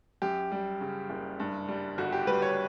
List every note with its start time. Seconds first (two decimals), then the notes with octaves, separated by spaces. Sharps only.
0.22 F#2 G4
0.52 G3
0.81 C#3
1.09 F#1
1.40 G2
1.68 G3
1.98 G1 F#4
2.13 G4
2.27 G3 B4
2.42 C#5